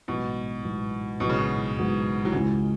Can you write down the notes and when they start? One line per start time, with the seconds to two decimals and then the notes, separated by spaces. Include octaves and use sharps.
0.08 A1 G#2 B2 F#3 B3
0.63 A1 G#2 F#3 B3
1.20 A1 G#2 B2 F#3 B3
1.29 C#3
1.38 B2
1.76 A1 G#2 F#3 B3
2.25 F#3
2.32 C#2 C#3 E3 G#3 C#4 F#4